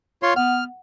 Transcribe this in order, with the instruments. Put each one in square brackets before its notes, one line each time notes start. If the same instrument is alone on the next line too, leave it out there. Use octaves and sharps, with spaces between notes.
[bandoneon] F4 C#5 C6
[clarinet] B3 [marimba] F#5 [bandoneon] F6